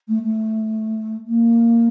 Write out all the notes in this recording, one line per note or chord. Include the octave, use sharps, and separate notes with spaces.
A3
A3
A#3